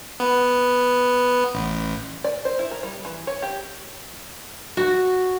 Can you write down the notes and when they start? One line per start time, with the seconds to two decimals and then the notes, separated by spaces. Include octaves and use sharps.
0.20 B3
1.54 A1
2.24 D5
2.45 C5
2.59 E4
2.71 A#4
2.83 G3
3.05 E3
3.27 C#5
3.42 G4
4.77 F#4